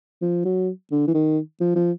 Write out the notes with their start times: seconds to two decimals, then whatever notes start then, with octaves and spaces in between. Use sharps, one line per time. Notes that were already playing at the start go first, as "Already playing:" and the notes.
0.22 F3
0.45 F#3
0.91 D3
1.08 E3
1.14 D#3
1.60 F3
1.75 F3